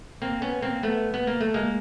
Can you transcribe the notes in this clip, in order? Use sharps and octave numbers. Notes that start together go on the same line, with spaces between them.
A#3 C4
B3 C#4
A#3 C4
A3 B3
B3
A#3
A3
G#3 A#3